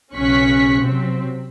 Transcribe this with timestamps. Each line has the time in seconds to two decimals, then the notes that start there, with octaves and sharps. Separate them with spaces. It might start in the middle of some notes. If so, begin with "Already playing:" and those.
0.15 B1 C#3 C#4 C#6 F#6 B6
0.82 C3 F#3 C4